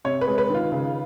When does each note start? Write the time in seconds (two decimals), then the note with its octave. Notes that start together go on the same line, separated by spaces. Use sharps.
0.05 C3 C#5
0.21 B4
0.27 G#3
0.38 B4
0.49 D#3
0.55 F4
0.72 C#3